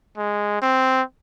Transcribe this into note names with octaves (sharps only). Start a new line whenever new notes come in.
G#3
C4